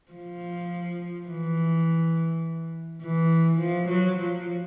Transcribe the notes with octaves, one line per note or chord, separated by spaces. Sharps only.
F3
E3
E3
F3
F#3
F3